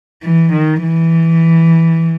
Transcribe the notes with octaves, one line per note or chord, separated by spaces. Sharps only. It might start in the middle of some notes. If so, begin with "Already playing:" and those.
E3
D#3
E3